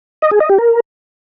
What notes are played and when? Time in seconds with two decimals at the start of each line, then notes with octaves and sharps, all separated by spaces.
0.22 D#5
0.31 G#4
0.40 D#5
0.49 G4
0.58 A#4